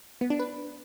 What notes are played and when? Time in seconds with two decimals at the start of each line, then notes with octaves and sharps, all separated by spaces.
0.21 B3
0.30 D4
0.39 B4